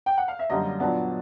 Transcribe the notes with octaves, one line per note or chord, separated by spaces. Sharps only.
G5
F#5
F5
E5
F#2 D3 G3 A#3 D4 D#5
A#2 F#3 B3 D4 A5